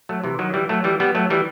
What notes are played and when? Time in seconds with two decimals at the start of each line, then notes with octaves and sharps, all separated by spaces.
0.09 F#3 A3
0.24 C3 E3
0.39 D#3 F#3
0.54 E3 G3
0.69 F#3 A3
0.84 E3 G3
1.00 G3 B3
1.15 F#3 A3
1.30 E3 G3